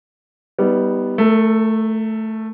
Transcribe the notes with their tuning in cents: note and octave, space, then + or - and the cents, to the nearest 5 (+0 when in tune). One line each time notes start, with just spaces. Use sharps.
G3 -10 B3 +0 D#4 +25
A3 +0 A#4 -35